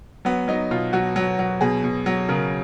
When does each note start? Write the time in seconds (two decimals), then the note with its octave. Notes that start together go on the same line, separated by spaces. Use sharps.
0.25 F#3 B3
0.48 F#3 D#4
0.71 B2 F4
0.93 F#3 F#4
1.16 F#3
1.39 F#3
1.61 B2 G#4
1.84 B2
2.06 F#3
2.29 C#3 A#4